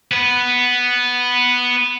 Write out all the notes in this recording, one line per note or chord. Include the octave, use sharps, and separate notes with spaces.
B3 B4